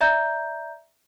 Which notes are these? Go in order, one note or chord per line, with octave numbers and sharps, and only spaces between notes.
D5 E5 A#5 G6